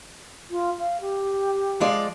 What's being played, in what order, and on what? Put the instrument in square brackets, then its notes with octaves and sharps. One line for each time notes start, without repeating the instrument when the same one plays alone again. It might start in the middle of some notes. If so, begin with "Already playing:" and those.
[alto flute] F4
F5
G4
[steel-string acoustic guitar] F3 G#3 D5